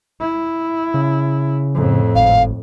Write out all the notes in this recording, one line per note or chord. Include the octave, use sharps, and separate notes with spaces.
E4
C#3
F2 A2
G#1 F5